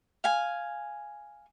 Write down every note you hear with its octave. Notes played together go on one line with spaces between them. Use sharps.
F5 G#5